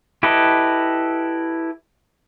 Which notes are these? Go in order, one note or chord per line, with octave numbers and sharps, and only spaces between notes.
E4 G4 A4 B4 D#5